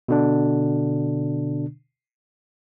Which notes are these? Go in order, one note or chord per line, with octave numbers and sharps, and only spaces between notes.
B2 D3 D4